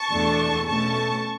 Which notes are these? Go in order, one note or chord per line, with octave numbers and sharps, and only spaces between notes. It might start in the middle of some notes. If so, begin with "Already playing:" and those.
Already playing: A5 C#6
E2 B2 A3 D4
B2 A3 C#4 A5 C#6